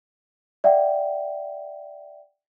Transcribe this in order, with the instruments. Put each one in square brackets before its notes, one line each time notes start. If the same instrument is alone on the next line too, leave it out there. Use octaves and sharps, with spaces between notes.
[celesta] D5 E5 F#5 G5